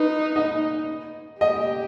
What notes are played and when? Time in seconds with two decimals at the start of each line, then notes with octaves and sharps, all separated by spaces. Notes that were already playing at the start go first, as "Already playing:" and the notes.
Already playing: D#4 B4
0.35 D#4 D#5
1.40 G4 D#5